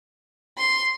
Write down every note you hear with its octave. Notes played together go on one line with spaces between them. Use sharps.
C6